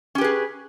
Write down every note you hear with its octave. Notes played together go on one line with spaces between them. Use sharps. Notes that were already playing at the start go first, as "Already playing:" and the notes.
C#4 G4 G#4 B4